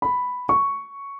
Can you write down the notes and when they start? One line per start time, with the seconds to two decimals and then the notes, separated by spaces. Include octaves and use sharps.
0.02 B5
0.49 C#6